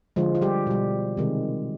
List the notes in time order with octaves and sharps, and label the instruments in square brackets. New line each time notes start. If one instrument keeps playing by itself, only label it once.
[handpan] D3 F3 G#3 F4
F4
G3 G4
B2 G3
C3 D#3 G#3